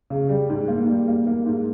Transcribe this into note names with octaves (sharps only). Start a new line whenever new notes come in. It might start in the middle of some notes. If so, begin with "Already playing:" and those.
C#3
G3
G#2
A#3
G3
A#3
A#3
G#2